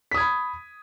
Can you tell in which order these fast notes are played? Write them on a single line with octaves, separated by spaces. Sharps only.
B6 D#6 G#6 B5